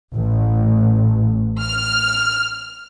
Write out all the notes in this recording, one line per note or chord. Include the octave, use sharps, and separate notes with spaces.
A1
F6